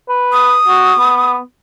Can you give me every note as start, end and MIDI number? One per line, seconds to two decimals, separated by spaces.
0.09 0.56 71
0.33 1.33 87
0.68 0.93 66
0.98 1.39 59